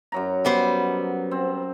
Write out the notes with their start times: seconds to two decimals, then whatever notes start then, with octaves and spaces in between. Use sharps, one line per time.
0.12 F#2 F#3 A#5
0.45 G3 B3 C5
1.31 C4